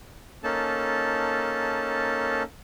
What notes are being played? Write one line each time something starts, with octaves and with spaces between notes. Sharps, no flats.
A#3 C#4 D#4 A4 A5